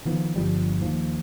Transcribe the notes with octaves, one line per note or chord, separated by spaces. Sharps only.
D#3 F3 B3
G1 F3 G3
D#2 F3